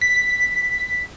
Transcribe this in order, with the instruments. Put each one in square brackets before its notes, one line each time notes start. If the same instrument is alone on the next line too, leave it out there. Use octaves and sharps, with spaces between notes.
[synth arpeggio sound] B6